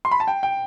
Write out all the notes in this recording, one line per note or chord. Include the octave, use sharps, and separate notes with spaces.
C6
B5
A5
G5
G5